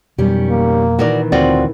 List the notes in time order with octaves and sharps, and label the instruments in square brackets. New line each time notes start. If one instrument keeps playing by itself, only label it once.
[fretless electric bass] F2 B2 F#3 [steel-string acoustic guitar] D#3 G3 C#4
[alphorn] A#3
[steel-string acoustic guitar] A#2 D#3 E3 [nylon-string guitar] F#4 A#4 D5
[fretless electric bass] D2 [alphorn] C4 [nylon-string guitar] F4 F#4 D5